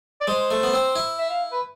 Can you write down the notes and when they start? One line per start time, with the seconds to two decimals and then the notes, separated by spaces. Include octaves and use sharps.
0.21 D5
0.27 G#3 C5
0.51 A3
0.63 B3
0.73 C4
0.96 E4
1.18 E5
1.30 F5
1.52 B4